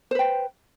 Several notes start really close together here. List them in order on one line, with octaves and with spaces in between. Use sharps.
C5 B4 G5